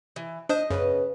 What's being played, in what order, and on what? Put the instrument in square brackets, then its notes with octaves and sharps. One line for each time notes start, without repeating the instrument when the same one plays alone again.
[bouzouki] E3
[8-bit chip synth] D4 C5 [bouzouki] D#5
[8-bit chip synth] F#2 [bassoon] C#3 [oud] B3 B4